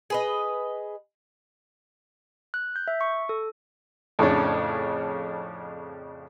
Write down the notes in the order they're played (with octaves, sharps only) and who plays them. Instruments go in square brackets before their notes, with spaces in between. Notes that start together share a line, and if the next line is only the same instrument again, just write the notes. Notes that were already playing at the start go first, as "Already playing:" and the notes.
[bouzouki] G#4 B4 D#5
[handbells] F#6
G6
E5
C#6
A4
[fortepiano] F2 A2 C#3 C#4 D4